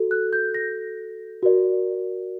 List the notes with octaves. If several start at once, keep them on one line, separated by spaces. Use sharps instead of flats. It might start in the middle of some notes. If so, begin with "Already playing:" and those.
Already playing: F#4 A4
F#6
G6
A#6
F#4 A#4 D5